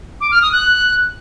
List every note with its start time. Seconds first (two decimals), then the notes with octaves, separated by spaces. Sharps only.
0.21 D6
0.31 F6
0.42 D#6
0.52 F#6